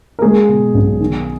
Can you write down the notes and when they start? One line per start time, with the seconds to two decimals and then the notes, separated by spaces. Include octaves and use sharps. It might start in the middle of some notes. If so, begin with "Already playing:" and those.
0.19 A#4
0.22 G#3 G#4
0.49 B2
0.74 B1
1.00 D#3